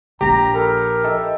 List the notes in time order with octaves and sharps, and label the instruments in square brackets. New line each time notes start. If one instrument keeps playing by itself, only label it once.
[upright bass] A#1 [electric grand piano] G4 [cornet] A#5
[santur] A4 B5 [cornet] A#4
[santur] D#4 A4 E5